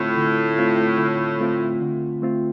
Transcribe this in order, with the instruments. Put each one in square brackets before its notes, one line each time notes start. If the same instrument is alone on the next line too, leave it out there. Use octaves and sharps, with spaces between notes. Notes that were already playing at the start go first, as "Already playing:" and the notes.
Already playing: [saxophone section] A2 [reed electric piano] D3 A3 C4 F4
[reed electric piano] D3
A3 C4 F4
D3
A3 C4 F4
D3
A3 C4 F4